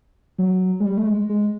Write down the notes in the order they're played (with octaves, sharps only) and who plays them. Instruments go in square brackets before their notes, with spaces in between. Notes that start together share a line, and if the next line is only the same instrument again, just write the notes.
[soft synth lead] F#3
G#3
G3
A3
G#3
G#3